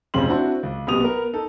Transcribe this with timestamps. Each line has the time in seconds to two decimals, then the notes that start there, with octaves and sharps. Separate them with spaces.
0.14 F1 F2 C#3 C4 C6 F#7
0.27 C4 D4 E4 F#4 C5
0.63 C#2
0.87 B1 C3 B3 G4 D#6 F7
1.00 B3 A#4
1.34 D#4 A4